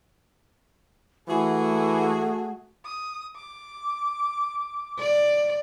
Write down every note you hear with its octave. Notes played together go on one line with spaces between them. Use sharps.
E3 A3 F#4 G#4
D#6
D6
D5